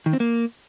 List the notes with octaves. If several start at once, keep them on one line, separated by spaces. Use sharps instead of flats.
D#3
C4
A#3